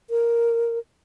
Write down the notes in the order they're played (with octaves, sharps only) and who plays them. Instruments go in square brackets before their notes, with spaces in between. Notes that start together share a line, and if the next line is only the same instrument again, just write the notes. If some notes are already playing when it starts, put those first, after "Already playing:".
[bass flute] A#4